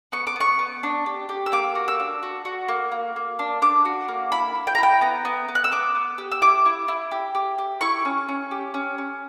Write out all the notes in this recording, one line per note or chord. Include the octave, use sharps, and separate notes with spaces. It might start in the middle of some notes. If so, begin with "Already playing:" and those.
B3 C#6
D6
B3 C#6
B3
D4
G4
G4
E6
A#3 D6
F#4
E6
D4
F#4
F#4
A#3
A#3
A#3
D4
D4 D6
F#4
A#3
E4 B5
E4
G5
A#5
E4 G5
B3 A#5
B3
B3
F#6
E6
B3 D6
B3
G4
E6
E4 D6
E4
E4
G4
G4
G4
E4 C#6
C#4
C#4
G4
C#4
C#4